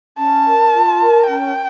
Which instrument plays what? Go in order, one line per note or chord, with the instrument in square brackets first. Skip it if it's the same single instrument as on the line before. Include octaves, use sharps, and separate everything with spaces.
[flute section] C#4 [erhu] A5
[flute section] A#4
F4
A#4
[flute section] C#4 [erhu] G5